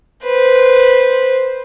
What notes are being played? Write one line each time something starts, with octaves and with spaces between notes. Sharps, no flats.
B4 C5